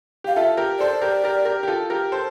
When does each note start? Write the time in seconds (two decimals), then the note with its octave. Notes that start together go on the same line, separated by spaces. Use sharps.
0.24 G4 F5
0.36 F4 A4 E5
0.57 G4 A#4
0.80 A4 C5 D5
1.01 G4 A#4
1.24 G4 A#4
1.45 G4 A#4
1.63 G4
1.68 F4 A4
1.90 G4 A#4
2.12 A4 C5